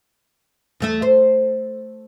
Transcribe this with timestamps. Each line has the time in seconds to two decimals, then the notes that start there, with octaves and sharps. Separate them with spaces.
0.80 E2 A3 E5
1.02 C5